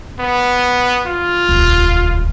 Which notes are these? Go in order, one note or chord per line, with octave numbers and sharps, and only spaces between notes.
B3
F4
D#1 C#2